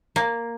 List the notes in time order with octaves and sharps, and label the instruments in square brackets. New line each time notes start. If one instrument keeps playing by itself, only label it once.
[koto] A#3